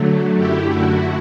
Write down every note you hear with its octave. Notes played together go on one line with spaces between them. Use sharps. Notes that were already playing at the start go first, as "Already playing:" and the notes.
Already playing: D3 F#3 A3
F#2 D3 A3 E4 G4
F#4